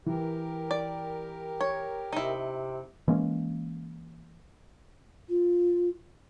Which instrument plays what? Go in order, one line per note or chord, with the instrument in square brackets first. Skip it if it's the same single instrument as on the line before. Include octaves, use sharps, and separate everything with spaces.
[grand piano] E3 [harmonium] G4 A#4
[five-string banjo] D5
C#5
[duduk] C3 [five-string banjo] D#4 E4
[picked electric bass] E3 G#3 A#3 C#4
[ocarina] F4